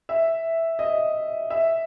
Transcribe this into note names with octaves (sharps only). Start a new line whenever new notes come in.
E5
D#5
E5